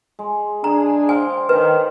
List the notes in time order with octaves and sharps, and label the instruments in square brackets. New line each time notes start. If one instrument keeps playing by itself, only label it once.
[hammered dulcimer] G#3
[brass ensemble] D4 G#4 [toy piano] A#5
[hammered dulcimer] C5 F5 G5 [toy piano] G#5
[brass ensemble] D#3 [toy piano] B4